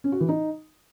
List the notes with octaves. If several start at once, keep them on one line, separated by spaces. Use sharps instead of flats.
C#4
F#4
E3
D#4